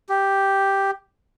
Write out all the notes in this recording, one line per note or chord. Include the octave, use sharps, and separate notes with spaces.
G4